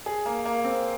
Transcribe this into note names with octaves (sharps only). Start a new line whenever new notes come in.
G#4
A#3
A#3
C4